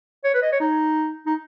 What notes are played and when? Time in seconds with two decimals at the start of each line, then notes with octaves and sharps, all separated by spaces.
0.24 C#5
0.34 B4
0.42 D#5
0.52 C#5
0.60 D#4
1.26 D#4